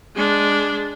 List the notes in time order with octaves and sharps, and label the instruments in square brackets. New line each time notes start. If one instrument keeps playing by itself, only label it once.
[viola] G#3 D4